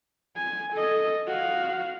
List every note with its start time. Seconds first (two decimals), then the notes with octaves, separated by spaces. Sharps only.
0.37 G#5
0.74 A4 D#5
1.28 F#4 F5